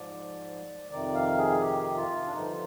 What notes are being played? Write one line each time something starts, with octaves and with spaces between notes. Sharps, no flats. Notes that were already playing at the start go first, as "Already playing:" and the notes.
Already playing: G#2 F3 D5
F2 C3 D#3 D5
F5
G#4
G4
F4
D4
G2 D3 F3 D#4